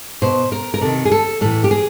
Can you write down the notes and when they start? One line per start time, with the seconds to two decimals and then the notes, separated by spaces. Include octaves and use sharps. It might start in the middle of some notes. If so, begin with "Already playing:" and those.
0.22 B2 C5
0.52 A#4
0.74 A#4
0.81 C3 D#3 A4
1.05 G#4
1.12 A4
1.41 A2 E3 A4
1.64 G4
1.71 G#4